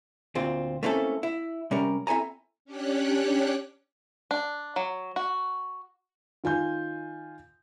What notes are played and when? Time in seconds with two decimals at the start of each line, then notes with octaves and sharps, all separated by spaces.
0.35 D2 A#2 C4 F4
0.83 A3 A#3 C4 C#4 E4 A4
1.23 E4
1.71 C3 G3 C#4 A#4
2.07 C4 E4 A4 G#5 A#5
2.65 C#4 D4 G4 C#5 F#6
4.31 D4
4.76 F#3
5.16 F#4
6.44 D#3 F4 G#5 G6